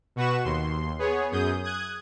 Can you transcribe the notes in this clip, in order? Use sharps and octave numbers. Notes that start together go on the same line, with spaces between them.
B2 F#4 B4 F#5 C#6 E7
D#2 C6
B3 G#4 C#5
F#2 G#4 D#6 G6
D#6 F#6 G#6